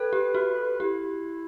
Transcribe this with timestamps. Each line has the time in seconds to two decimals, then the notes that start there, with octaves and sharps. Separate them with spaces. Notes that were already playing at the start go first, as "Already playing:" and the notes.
Already playing: A4 B4
0.13 G4
0.35 F#4
0.80 E4 G4